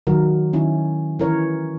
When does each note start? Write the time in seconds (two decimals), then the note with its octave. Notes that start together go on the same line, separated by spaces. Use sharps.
0.07 D#3 F#3 F#4 A#4
0.53 D#3 C#4 E4
1.19 D#3 E3 C#4 A#4 C#5